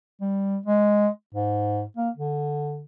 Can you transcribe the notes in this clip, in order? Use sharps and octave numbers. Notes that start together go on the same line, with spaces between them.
G3
G#3
G#2
A#3
D3